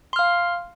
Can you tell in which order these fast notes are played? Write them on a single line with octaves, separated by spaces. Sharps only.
C6 F6 F5